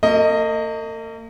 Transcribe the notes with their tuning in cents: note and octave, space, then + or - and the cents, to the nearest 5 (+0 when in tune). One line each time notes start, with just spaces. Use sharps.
A#3 -45 D#5 +0